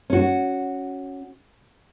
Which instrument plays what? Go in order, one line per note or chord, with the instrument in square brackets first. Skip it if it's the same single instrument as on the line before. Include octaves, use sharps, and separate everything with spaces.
[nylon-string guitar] C#4 F#4